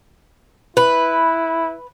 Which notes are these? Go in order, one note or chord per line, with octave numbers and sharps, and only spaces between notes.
E4 B4